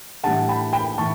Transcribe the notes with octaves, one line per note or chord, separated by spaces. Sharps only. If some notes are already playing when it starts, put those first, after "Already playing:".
A2 E3 G3 D4 F#5 A5
G5 B5
G5 B5
A2 E3 A5 C#6